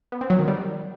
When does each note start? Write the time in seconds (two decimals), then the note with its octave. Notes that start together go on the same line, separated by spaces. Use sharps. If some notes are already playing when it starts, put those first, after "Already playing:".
0.12 B3
0.21 C4
0.30 F#3
0.39 D#3
0.48 G3